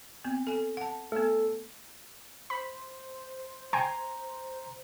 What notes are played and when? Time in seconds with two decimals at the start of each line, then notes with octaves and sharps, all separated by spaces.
0.24 B3 C4
0.47 A4 G#5
0.77 F#5 A5
1.12 A3 B3 A4
2.50 C5 B5
3.73 G5 G#5 A#5 C6